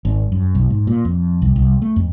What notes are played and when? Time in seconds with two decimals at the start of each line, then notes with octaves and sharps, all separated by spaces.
0.05 G#1
0.32 F#2
0.55 B1
0.70 G#2
0.87 A#2
1.05 F2
1.42 C2
1.56 C2
1.82 A3
1.96 F2